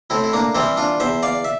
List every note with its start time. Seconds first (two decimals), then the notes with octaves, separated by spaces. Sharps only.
0.10 A2 C4 E4
0.24 E4
0.33 A#3 D4
0.55 E3 G3 C4 E4
0.77 D4 F4
1.00 E2 C5 E5
1.23 D5 F5
1.44 E5